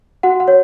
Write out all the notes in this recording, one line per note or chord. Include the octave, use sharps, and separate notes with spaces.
F#4 F#5
F#5
C#5